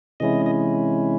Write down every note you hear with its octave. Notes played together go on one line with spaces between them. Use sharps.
C3 E3 G#3 C#4 E4 D#5
D#5